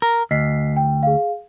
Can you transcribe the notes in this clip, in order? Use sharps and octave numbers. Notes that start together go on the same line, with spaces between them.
A#4
D2 D#5 B6 C7
G5
G#4 F5